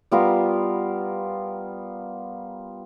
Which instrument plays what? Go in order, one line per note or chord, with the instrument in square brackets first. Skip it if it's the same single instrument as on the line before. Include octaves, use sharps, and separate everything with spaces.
[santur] G3 B3 F4 A#4